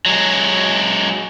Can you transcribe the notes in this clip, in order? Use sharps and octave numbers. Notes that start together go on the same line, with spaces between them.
F#3 G#3